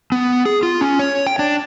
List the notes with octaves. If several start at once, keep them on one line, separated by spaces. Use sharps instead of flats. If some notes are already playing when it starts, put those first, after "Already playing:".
B3
G#4
F4
C#4
C#5
G5
D4